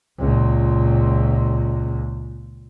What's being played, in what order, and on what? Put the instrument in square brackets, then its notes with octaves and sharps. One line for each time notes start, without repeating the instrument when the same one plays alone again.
[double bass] C#2 A#2